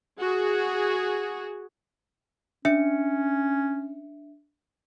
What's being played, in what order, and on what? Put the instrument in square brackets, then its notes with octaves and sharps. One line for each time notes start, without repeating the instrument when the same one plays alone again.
[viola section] F#4 G#4
[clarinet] C#4 [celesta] D4 E5 C#7